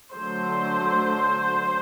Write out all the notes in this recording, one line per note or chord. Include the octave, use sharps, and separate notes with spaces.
D3 F#3 A3 C5